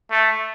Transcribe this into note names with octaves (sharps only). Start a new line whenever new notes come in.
A3